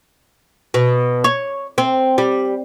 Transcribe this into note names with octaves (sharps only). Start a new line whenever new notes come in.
B2
C#5
C4
G3